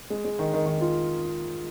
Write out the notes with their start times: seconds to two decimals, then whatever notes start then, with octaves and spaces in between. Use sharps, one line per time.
0.10 G#3
0.25 G#3
0.39 D#3
0.53 D#3
0.66 D#3
0.81 F4